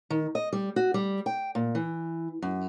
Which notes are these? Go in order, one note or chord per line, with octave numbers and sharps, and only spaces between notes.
D#3
D#5
G3
F#4
G3
G5
A#2
E3
F#2